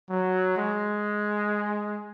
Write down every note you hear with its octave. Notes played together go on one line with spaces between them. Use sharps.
F#3
G#3